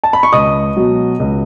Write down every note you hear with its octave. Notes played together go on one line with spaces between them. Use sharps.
A5
B5
C#6
C#2 D#5 D#6
B2 F#3
C#2